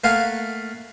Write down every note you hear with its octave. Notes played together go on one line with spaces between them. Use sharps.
A3 A#3 A#4 F5 F#5 G#5